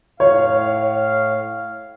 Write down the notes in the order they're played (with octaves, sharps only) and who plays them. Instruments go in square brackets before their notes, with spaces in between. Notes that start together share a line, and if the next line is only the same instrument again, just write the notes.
[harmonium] A2 F5 [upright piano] C#5